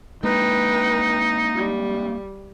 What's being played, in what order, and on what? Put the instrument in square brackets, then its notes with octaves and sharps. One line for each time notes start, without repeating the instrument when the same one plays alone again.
[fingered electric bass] G#3 A#3 D4 [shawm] D#4 [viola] B4 G5
[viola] G3